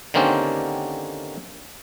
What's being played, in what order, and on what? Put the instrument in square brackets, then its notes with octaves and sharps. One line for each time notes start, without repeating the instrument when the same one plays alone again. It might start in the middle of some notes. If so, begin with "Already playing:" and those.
[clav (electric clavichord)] D3 D#3 A#3 C4 C#4 G4